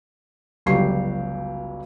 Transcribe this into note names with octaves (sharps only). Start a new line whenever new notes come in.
G1 C#2 F#3 G4 C#6 C7